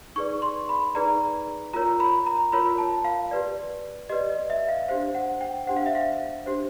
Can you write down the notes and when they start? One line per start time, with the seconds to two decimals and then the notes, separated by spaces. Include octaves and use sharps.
0.16 D#4 G#4 B4 D5 C#6
0.42 C6
0.69 B5
0.95 D#4 G#4 B4 D5 A#5
1.73 F4 A#4 C#5 A#5
2.00 B5
2.26 A#5
2.52 F4 A#4 C#5 B5
2.78 A5
3.05 F5
3.31 G4 B4 D5
4.09 G4 B4 D5 D#5
4.30 D#5
4.50 E5
4.69 F5
4.88 D4 G4 C5 F5
5.15 F#5
5.41 G5
5.67 D4 G4 C5 F#5
5.77 F5
5.86 E5
5.95 F5
6.46 D4 G4 C5